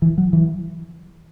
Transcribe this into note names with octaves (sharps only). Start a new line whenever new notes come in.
E3
F#3
E3